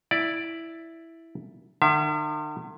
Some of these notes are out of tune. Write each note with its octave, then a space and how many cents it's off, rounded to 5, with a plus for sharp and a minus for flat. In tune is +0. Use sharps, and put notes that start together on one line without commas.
E4 +0 D5 +0
D#3 -45 E5 +35